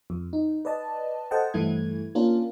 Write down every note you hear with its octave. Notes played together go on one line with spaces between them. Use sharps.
F2
D#4
B4 D5 D#5 A5
A4 C5 D#5 F#5 G5 A5
G2 E3 A3 E4 G#6
A#3 C#4 D4 F4 A#4